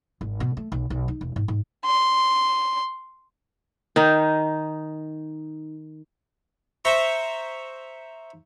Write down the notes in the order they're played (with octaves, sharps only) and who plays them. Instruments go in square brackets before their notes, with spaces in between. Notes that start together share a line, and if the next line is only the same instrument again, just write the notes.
[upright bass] G#1
B2
A3
B1
B1
D#4
E1
G#2
G#2
[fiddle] C6
[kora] D#3 D#4
[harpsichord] C5 E5 A#5 C#6